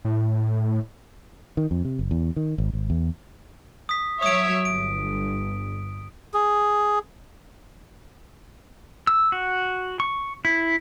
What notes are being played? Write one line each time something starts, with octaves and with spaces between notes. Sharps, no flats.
A2
D#3
F2
C3
F#1
E2
D#3
G#1
G#1
E2
D#6 B6
F#3 C#5 E5 D#6 D7
G1 G2 D7
G#4
E6
F#4
C#6
E4